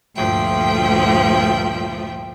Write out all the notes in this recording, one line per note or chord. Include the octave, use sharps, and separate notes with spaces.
D2 G2 A#2 F3 E5 G5